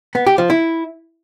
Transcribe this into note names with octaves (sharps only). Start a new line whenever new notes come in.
B3
G4
F3
E4